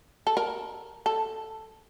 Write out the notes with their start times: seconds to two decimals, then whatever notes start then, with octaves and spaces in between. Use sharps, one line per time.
0.27 A4
0.37 A#4
1.06 A4